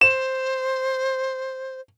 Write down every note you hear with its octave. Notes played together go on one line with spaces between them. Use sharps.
C5 E7